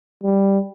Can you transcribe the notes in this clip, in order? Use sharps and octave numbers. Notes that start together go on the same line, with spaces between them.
G3